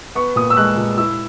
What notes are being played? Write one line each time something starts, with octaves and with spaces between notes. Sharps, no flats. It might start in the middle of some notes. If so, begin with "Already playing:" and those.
B3 C#6
A#2 D#6
E6
G#3 F#6
A#2
E4 E6